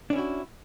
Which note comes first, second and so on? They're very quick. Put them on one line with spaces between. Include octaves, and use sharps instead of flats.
D4 C#4 E4 F#4